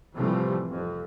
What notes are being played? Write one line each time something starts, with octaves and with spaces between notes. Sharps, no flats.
A2 C3 E3 F3 G3 A3
F2